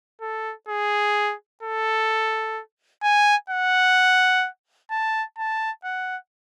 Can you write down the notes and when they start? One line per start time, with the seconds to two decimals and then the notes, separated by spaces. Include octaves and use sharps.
0.21 A4
0.68 G#4
1.63 A4
3.03 G#5
3.50 F#5
4.91 A5
5.38 A5
5.84 F#5